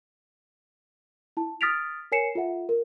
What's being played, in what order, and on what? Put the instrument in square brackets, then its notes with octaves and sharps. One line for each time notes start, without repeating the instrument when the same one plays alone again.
[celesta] E4 A5
D#6 F6 A6 B6 D7 F7
A#4 C#5 G#5 C7 C#7 E7
F4 A4 E5 F#5
A#4